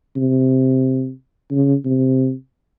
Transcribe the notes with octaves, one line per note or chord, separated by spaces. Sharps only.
C3
C#3
C3